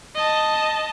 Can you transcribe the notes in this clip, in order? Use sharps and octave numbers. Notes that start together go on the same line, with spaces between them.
D#5 A5